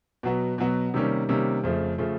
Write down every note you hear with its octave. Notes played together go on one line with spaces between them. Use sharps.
B2 F#3 B3
B2 F#3 B3
C3 D#3 G3 A#3 C#4
C3 D#3 G3 A#3 C#4
F2 C#3 F3 A3
C#3 F3 A3